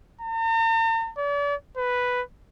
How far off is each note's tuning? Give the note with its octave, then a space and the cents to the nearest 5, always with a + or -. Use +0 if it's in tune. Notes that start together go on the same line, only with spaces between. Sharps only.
A#5 -45
D5 -40
B4 +0